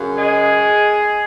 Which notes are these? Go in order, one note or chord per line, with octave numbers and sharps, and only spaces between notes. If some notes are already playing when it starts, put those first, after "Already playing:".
Already playing: F#2 C#3
G#3 G#4